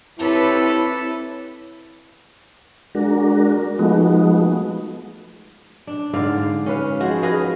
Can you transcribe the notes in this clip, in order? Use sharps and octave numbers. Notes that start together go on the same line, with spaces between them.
C4 E4 G4 A4 B4 C#5
G#3 D4 F#4 A#4
F3 G#3 A3 B3 D#4 F#4
D4
G#2 D3 D5 F5
C#4 B4 F5
F3 G#3 F#4 G#4
G#4 B4 D#5 F5